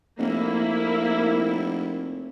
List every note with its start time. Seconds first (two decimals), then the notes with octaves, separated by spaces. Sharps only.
0.18 F1 A#3 E4